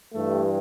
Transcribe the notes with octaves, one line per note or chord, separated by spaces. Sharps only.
G2 E3 G3 A3